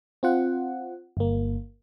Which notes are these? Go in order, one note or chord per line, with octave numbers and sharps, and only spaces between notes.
C4 F4 F#5
G1 A#3